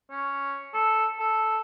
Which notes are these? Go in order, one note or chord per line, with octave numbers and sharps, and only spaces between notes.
C#4
A4
A4